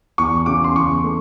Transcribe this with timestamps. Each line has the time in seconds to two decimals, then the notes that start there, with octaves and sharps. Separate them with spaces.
0.18 E2 C#6
0.46 C#3 D6
0.64 C6
0.76 E2 C#6
1.04 A3